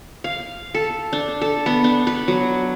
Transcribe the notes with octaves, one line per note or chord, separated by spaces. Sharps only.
F5
A4
D4
A4
B3
D4
B4
F#3